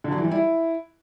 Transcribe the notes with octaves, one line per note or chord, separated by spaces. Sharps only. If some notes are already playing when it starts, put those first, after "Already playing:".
D3
F#3
E3
G3
E4